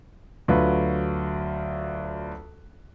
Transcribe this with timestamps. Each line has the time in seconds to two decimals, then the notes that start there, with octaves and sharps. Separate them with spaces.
0.48 D2 F#3 F4 B4